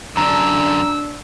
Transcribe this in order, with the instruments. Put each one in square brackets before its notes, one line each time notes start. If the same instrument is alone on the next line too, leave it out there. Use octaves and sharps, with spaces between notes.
[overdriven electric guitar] F#2 D3 [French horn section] D4 [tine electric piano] A#5 [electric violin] E6